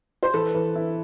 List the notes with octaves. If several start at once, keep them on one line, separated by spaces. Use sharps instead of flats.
C5
E3 A4 B4
E3
E4